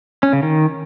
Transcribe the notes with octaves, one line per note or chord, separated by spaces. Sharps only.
C#4
C#3
D#3